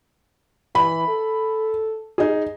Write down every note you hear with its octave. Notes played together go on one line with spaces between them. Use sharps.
E3 B5
A4
D#4 G#4